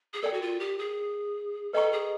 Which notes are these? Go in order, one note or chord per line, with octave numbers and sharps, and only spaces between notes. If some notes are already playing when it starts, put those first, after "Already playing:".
G#4
A4 A#4 D5 G5
F#4
F4
G4
G#4
A4 B4 D#5 G5 A#5 C#6
G#4